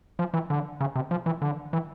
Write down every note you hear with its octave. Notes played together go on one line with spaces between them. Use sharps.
F3
E3
D3
C#3
C3
F3
E3
D3
E3